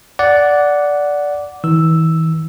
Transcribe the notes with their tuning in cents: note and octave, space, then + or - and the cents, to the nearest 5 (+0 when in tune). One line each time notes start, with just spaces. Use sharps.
D5 -10 F#5 +0
E3 -40 E6 +0